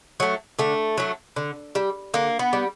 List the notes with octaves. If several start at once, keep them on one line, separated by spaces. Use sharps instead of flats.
F#3 A3
D3 A3
F#3 A3
D3
G3
D3 A#3
B3
G3